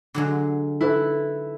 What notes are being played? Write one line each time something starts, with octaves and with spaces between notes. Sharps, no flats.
D3 F#3 G#3
E4 A4 B4